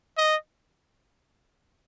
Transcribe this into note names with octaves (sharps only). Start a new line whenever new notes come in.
D#5